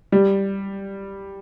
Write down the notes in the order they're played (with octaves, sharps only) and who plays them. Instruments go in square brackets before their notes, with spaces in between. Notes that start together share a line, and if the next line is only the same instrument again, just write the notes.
[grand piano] G3